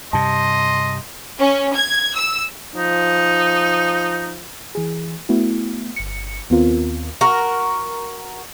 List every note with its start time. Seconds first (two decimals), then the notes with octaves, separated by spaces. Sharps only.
0.13 G2 C3 D#5 A5 C6
1.39 C#4
1.74 G#6
2.15 E6
2.76 F3 D#4
4.75 E3 G#4
5.29 A3 B3 E4 F#4
5.96 G1 C#7
6.50 D#2 B3 C4 F4 A#4
7.21 F#4 A#4